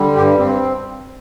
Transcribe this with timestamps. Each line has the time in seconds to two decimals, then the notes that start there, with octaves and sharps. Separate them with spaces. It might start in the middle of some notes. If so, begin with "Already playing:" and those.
Already playing: D3 G3
0.16 G2 G4
0.39 G2 C4